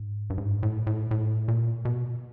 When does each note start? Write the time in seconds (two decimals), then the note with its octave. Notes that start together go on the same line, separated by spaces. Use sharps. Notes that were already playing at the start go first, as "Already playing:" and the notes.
Already playing: G#2
0.30 G2
0.38 G#2
0.63 A2
0.87 A2
1.11 A2
1.48 A#2
1.85 B2